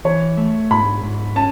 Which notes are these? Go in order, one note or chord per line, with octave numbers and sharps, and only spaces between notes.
E3 C#5
A3
G#2 B5
G#2
C#4 A5